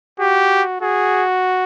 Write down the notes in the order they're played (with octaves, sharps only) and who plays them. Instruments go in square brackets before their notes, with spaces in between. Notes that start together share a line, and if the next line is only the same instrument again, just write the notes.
[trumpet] F#4 [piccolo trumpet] G4
[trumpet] F#4 [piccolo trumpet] G#4